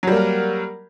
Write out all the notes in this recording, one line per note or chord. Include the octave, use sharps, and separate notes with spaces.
F#3 G3 A#3 A#4